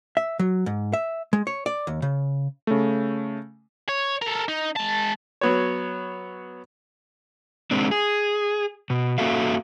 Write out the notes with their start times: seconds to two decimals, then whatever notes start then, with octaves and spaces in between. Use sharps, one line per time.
0.17 E5
0.39 F#3
0.66 G#2
0.93 E5
1.33 G#3
1.47 C#5
1.66 D5
1.87 D#2
2.02 C#3
2.67 C#3 A3
3.89 C#5
4.22 A4 A#4
4.49 D#4
4.76 G#3 A5
5.41 F#3 B3 C#5
7.71 G#3 C4 D4
7.91 G#4
8.90 B2
9.18 A#3 C#4 F#4 A4 E5 F5